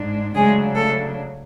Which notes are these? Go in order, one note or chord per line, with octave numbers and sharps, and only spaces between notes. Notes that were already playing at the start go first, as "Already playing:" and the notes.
Already playing: G#2 G#3 D4
C#3 F#3 G#3 A3 D4 G#4
A3 A4